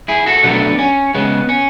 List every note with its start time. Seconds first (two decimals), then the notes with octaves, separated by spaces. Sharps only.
0.08 E4 G#4
0.26 F#4 A4
0.44 B2 F#3 A3 B3 D4
0.79 C#4
1.14 C#3 G#3 B3
1.49 C#4